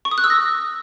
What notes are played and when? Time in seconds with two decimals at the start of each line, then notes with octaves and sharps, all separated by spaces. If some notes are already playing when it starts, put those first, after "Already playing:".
0.05 C#6
0.11 D#6
0.18 F#6
0.24 E6
0.30 A#6